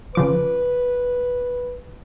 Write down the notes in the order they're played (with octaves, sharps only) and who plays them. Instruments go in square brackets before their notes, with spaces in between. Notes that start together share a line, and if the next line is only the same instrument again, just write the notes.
[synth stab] C#3 F3 D6 [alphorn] B4